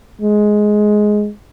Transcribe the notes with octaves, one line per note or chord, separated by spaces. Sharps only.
G#3